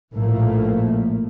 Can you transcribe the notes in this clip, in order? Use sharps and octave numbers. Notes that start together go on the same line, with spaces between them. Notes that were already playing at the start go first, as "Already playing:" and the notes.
A#1 A2 F3 A3 A#3